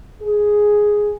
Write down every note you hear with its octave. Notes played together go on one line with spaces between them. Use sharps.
G#4